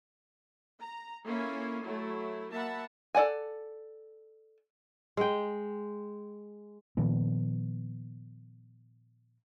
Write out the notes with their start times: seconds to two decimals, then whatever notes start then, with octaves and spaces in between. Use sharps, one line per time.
0.81 A#5
1.25 A#3 C#4 E4 F4 A4 G#5
1.83 F#3 A3 E4
2.51 A#3 E5 F#5 A5 B5
3.15 A4 D5 F#5 G#5
5.17 G#3 G5
6.97 A#2 D#3 F3 B3